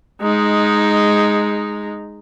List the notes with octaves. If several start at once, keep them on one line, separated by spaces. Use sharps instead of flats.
G#3 D#4